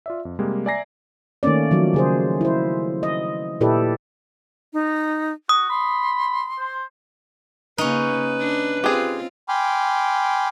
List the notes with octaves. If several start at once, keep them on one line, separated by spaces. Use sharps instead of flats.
F4 D5 E5
F2
C3 G3 G#3 A#3
D5 E5 G#5 A#5 A#6 C7
D#3 A3 A#3 C#4 D5
D#3 F3 F#3
C#3 G#4 C5
E4 C5
D#5
A#2 E4 G4 A4 B4 D5
D#4
F#4 D#6
B5 C6
C5
C#3 A#3 C#4 D#4 B4
D4
C4 F4 G4 G#4
G5 G#5 B5 C6 D6 F6